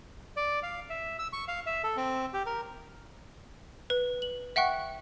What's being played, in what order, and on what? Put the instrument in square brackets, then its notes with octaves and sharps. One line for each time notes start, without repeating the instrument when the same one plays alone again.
[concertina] D5
F5
E5
E6
C#6
F5
E5
A4
C4
G4
A#4
[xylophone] B4
F#7
E5 F#5 G5 C#6 F#6